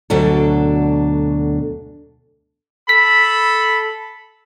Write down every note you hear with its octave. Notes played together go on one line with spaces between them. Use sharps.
D2 B2 F#3 D4 A4
A4 B5 B6